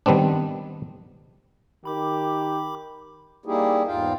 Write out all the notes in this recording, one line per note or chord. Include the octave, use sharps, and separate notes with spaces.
D#3 G3 B3 C4 D4
D#3 G4 B5 D6
G3 A#3 D#4 E4 G4 G#4
E2 G#2 D#4 F4 F5 G5